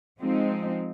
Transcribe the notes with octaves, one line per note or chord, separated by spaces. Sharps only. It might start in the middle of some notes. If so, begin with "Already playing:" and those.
F3 G#3 C4 D#4